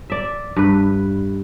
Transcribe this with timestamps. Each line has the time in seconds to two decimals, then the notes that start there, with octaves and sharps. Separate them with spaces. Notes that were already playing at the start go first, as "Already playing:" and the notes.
0.10 D5 E5
0.56 G2 B4